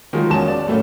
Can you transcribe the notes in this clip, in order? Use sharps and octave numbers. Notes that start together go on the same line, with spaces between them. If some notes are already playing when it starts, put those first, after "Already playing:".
D#3 F3 F#3 G#3 A#3
E1 C#4 F#4 G#5 A5 E7
D5
A2 F#3 A3 A#3 C#4